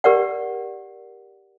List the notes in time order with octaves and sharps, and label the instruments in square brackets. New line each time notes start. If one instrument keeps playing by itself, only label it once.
[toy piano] G4 A#4 D5 F#5